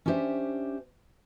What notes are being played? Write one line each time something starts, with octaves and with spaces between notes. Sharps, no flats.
C#4 D4 E4 G4 C5 E5